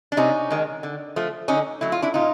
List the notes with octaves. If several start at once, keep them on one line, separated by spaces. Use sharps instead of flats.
D4
C3 C#4 D#4
D#3 G#3
D3
F3 A3
D3 C#4 D#4
F#3 A3 E4
F4
D4 E4
A#2 D#4 F4